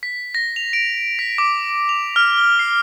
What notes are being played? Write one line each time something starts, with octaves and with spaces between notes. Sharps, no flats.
B6
A#6
F7
D7
B6
D6
F7
F6
G7
C7